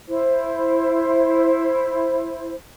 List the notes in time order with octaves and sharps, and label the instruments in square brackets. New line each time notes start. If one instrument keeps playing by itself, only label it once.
[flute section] E4 C5